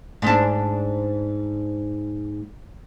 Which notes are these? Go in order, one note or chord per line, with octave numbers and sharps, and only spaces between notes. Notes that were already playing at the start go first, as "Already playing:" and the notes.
G#2 D4